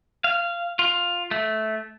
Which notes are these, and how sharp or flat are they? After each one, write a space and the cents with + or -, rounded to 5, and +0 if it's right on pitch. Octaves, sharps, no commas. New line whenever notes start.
F5 -15
F4 +10
A3 -15